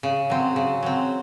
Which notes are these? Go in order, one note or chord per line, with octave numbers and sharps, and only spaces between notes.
C#3
F#3 C4
C#3
F#3 C4